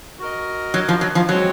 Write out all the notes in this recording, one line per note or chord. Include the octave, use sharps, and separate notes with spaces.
F#4 A#4 D#5
F#3
F3
F#3
F3
F#3 G#3 C4 F#4 C#5